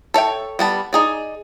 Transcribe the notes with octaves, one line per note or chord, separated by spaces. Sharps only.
A4 C#5 E5 G5
G3 B3 A5
D#4 G#4 D5